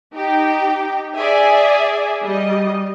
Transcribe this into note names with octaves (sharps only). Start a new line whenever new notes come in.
D#4 G4 G5
G#4 D5 E5 G#5
G3 D#5